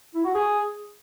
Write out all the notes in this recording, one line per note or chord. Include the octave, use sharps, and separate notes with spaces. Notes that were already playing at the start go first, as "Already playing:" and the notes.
E4
F#4
G#4